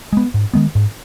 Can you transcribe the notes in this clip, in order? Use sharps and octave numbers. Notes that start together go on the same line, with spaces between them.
G#3 B3
G#2
D#3 G#3 B3
G#2